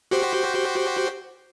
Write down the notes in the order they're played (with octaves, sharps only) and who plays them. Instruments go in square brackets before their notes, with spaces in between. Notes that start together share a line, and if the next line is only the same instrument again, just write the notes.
[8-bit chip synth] F#4 G4 C5